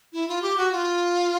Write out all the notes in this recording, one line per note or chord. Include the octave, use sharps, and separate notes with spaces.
E4
F4
G4
F#4
F4